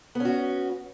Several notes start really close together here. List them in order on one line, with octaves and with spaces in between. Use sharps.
B3 C#4 F#4